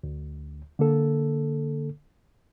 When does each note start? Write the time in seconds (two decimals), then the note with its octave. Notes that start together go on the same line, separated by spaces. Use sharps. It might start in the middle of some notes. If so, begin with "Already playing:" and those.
0.04 D2
0.79 D3 A#3 A4